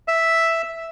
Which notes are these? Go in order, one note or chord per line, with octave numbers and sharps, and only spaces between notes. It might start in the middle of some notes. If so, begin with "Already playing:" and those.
E5